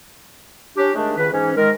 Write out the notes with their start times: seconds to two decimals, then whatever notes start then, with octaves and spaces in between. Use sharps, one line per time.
0.77 C#4 D4 G4
0.95 D#3 G#3 A3 D4
1.17 C#2 D#3 B4
1.33 G#2 E3 C#4
1.57 D#3 G#3 A#4